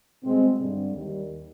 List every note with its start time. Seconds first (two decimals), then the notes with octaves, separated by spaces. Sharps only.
0.23 B2 G3 G#3 C4
0.58 G2 D3 G3
0.92 D#2 D#3 G3